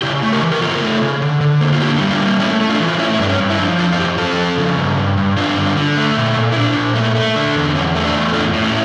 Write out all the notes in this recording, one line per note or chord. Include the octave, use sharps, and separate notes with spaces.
C#3 E4 G4
A3
G4 A#4
E3
A#4
C#3 F4 A4
A3
C#3
D3
D3
A#3
F4
D3 E4 G4
G3
D4 F4
A#3
A3 C#4 E4
A3
D4 F4
E3
F4
A3 C#4 E4
E4
G2 D4
C#4
G2
E4
F3 D4
F2 D4 F4
F4
F2 E4 G4
F2 F4 A4
F2
C#3
G2
G2
G2
G2 D4 F4
D3
D3
A3
A#2
A#2
E4
A#2 D4
A#2
A3
A3
D3
E2
E2 C#4
A3
D4
E2
A2 D4 F4
A2
C#4 E4